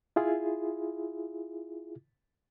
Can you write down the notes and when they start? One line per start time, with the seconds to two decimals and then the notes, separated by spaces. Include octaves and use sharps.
0.16 E4 F4 G#4